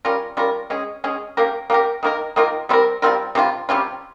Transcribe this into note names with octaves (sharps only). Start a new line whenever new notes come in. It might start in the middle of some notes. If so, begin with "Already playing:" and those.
G3 C#4 F4 A#4
G3 C#4 F4 A#4
G#3 C#4 G#4
G#3 C#4 G#4
A#3 C#4 G4 A#4
A#3 C#4 G4 A#4
D#3 A#3 F4 A#4
D#3 A#3 F4 A#4
G3 C4 F4 A#4
G3 C4 F4 A#4
C3 G3 C#4 F4
C3 G3 C#4 F4